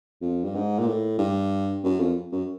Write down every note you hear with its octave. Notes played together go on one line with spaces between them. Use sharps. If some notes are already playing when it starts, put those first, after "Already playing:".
F2
G2
G#2
A#2
A2
G2
F#2
F2
F#2